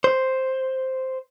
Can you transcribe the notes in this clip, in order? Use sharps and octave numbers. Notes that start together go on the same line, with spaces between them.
C5